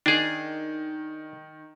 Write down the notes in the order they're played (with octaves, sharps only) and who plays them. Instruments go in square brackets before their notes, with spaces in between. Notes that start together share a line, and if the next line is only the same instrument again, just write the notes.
[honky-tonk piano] D#3 [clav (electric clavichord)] D4 G#4